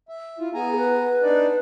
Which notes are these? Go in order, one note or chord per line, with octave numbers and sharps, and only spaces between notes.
E5
E4 F4
B3 G#4 G#5 A#5
B4
D4 D#4 D5